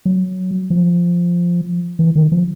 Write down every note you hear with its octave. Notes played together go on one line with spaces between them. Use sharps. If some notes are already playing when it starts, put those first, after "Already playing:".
F#3
F3
E3
D#3
F3